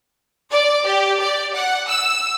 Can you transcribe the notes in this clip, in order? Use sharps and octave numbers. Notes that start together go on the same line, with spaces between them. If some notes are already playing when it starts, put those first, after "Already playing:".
D5
G4
D5
F#5
E6